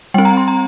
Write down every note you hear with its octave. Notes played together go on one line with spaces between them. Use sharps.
G3 C4 G5
A#5
C6
A#5